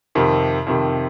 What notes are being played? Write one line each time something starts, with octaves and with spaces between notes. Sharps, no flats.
F2 C3 D#3
F2 C3 D#3